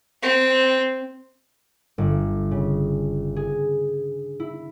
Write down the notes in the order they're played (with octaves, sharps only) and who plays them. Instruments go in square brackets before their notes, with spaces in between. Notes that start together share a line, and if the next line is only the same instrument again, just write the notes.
[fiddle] C4
[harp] G1
C#3
G#4
E4